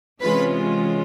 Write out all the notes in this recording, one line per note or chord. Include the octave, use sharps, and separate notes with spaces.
C3 E3 G#3 C#4 F4 B4 B5